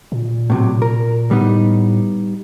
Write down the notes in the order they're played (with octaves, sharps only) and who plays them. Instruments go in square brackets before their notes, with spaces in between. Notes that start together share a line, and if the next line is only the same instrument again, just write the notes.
[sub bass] A#2
[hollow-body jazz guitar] A2 C3 F#3
A#4
[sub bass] A2 [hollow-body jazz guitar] G3 B3 D#4